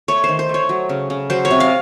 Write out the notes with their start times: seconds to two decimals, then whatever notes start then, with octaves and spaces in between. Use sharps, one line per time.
0.08 A3 C#5
0.24 D#3 C5
0.39 C5
0.49 A3
0.54 C#5
0.69 F#3
0.89 C#3
1.10 C#3
1.30 F#3 C5
1.45 C#5
1.51 C3
1.60 F5